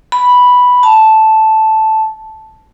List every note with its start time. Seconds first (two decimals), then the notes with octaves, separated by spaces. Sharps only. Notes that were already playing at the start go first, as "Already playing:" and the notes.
0.12 B5
0.83 A5